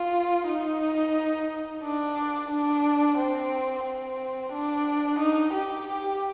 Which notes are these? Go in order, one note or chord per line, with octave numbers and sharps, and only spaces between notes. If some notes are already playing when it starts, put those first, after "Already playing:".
Already playing: F4
D#4
D4
D4
C4
C4
D4
D#4
G4
G4